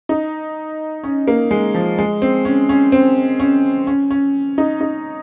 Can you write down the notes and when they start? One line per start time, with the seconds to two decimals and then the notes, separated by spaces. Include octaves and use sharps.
0.09 D#4
1.04 C#4
1.28 A#3
1.51 G#3
1.74 F3
1.99 G#3
2.22 C4
2.45 C#4
2.69 C#4
2.92 C4
3.40 C#4
3.87 C#4
4.11 C#4
4.58 D#4
4.81 D#4